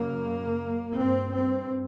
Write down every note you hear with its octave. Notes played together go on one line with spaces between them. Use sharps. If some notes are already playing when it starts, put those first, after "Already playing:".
Already playing: F#2 C#3 A#3
G2 C4
C4